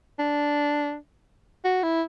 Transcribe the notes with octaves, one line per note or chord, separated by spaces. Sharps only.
D4
F#4
E4